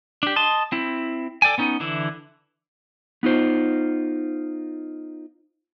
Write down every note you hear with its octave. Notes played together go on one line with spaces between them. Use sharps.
D4 G4
D#5 A5 C6
C4 E4
A4 D5 G5 G#5
B3 C#4 D#4
D3 E3 E4
B3 D#4 F4 C5